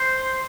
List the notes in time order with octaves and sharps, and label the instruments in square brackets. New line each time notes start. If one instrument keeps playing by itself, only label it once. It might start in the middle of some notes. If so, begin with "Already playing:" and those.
Already playing: [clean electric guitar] C5